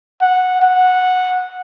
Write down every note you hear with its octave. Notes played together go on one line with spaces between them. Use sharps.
F#5
F#5